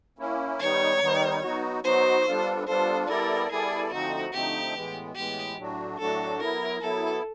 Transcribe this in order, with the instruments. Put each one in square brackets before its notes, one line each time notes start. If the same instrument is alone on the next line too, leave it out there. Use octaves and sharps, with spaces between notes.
[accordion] A#3 C#4 E4
[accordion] D#3 G3 B3 D#4 [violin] C#5
[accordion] D#3 G3 B3 D#4
F#3 B3 D#4 F#4
[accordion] F#3 B3 D#4 F#4 [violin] C5
[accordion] G3 B3 D4 F4 A4
[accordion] G3 B3 D4 F4 A4 [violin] C5
[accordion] G3 B3 E4 A4 D5 [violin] A#4
[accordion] G3 B3 E4 A4 D5 [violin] G#4
[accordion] D3 F3 A3 C4 D#4 [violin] F#4
[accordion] D3 F3 A3 C4 D#4 [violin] G4
[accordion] A2 E3 G#3 B3
[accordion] A2 E3 G#3 B3 [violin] G4
[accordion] A2 F#3 A3 D4 F#4
[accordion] A2 F#3 A3 D4 F#4 [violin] A4
[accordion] F#3 B3 E4 [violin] A#4
[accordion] F#3 B3 E4 [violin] A4